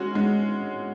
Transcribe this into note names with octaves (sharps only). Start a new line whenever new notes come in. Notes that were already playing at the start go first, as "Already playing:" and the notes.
Already playing: G#3 C#4 F#4
G#3